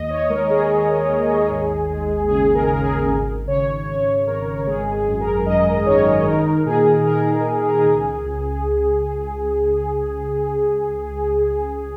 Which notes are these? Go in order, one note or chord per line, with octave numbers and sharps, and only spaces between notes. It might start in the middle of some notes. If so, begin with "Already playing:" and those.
Already playing: D#2 D#5
C#5
G#3 A#4
G#4
G#3
D#2
G#1
G#3
C#3 G#4
A#4
C#3
G#4
G#1
C#3 C#5
G#1 C#5
G#1 A#4
G#3 G#4
G#4
F#2
A#4
F#2 D#5
D#3 C#5
D#4 A#4
A#2 G#4
A#2 A#4
A#4
D#4
G#4
A#4
G#4
C#2
C#2